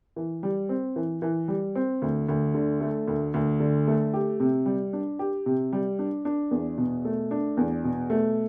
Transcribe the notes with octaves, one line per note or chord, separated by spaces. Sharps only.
E3
G3
C4
E3
E3
G3
C4
D2
D2
D3
A3
D2
D2
D3
A3
G4
C3
G3
D4
G4
C3
G3
D4
D4
E2
B2
A3
D4
E2
B2
A3